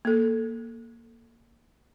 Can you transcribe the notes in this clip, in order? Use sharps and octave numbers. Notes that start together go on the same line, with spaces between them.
A#3 A4